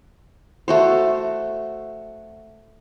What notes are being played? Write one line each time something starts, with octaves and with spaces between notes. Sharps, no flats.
A3 F#4 C5